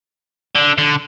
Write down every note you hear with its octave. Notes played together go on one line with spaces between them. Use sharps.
D3
D3